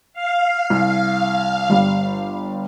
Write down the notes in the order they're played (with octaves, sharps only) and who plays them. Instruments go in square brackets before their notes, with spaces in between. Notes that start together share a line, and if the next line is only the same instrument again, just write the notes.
[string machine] F5
[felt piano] C2
G1 G3